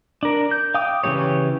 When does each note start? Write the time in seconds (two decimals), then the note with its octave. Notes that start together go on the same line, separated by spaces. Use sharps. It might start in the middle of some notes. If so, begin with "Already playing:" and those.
0.23 D4 A#4
0.51 G6
0.74 F5 G5 D6 D#6
1.04 C#3 E3 A3 G4 C#5